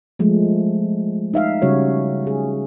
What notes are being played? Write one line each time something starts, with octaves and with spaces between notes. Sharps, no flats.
F3 G#3 A3
D#4 E5 F5
C#3 G3 C#4 F#4 C#5
G#4